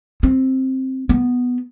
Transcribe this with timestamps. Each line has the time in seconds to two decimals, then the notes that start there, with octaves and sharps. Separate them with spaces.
0.23 C4
1.09 B3